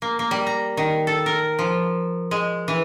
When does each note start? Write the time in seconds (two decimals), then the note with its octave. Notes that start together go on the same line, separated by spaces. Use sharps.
0.02 A#3
0.19 A#3
0.31 G3
0.47 A#5
0.77 D#3
1.07 A4
1.26 A#4
1.59 F3
2.31 G#3
2.68 E3